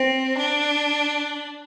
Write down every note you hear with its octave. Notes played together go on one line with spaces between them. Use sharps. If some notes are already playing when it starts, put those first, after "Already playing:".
Already playing: C4
D4